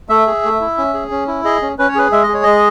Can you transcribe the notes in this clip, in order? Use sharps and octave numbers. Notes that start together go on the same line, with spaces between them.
A3 E5
G#4
A3
E4
C#4
G#4
C#4
E4
G#4 D#5
C#4
C#4 B4
C#5
G#4 B4
G#3 E5
D#5
G#4
C#5
G#3 D#5